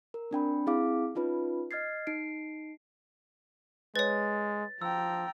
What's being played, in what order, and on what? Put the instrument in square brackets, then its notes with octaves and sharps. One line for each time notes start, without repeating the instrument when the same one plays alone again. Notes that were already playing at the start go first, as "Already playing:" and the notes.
[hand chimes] A#4
C4 D4 G5 B5
C4 E4 G#4 F5 D6
C#4 D#4 F4 B4
D#5 F6 G#6 A6 C7
D#4 C7 D7
[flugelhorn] G#3 [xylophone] B4 C#5 [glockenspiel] A6
[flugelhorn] F3 [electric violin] G5 A#5 [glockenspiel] E6